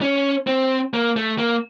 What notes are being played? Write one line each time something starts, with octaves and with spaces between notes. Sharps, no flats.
C#4
C4
A#3
A3
A#3